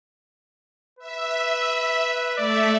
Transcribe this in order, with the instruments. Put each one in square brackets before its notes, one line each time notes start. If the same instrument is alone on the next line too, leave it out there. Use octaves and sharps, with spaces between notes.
[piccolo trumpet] B4 [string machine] E5
[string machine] A3 E5 [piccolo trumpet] D5